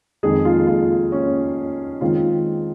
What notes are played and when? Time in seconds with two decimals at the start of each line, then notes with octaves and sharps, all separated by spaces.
0.23 F2 D#3 G#3 G#4
0.45 F4
0.67 F4
1.12 C#4
2.01 D#3 G#3 C4 F4